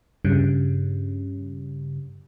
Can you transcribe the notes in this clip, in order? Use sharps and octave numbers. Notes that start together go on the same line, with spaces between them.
G2 C#3